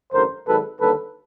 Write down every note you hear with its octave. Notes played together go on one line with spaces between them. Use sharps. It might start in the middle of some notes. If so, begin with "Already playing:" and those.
A1 G2 D3 A#4 C5
G#1 G#2 D#3 F#3 A4 B4
D#2 D3 G3 A#3 A4 B4